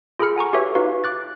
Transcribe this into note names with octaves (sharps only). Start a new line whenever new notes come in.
F4 G#4 A4 B5 F6 C#7
F#5 G#5 A#5 C#6
F#4 G4 A4 B4 C#5 E5
D#4 F4 F#4 B4 F5
D6 F#6 A6